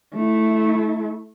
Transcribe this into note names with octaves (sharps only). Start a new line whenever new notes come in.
A3 E4